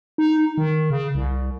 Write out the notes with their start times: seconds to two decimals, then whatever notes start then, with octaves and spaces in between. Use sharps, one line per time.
0.18 D#4
0.58 D#3
0.90 C#3
1.15 C2